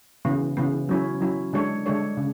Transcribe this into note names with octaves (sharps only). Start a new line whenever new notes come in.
C#3 E3 B3
C#3 E3 B3
F#3 C#4 E4
F#3 C#4 E4
D3 G#3 D4 A4 C#5
D3 G#3 D4 A4 C#5
C#3